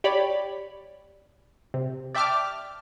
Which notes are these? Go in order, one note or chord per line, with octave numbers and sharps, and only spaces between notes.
G4 C#5 D5 B5
C3
D5 E5 G5 A5 D6 F6